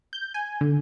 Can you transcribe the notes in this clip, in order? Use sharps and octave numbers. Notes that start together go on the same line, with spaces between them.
G6
G#5
D3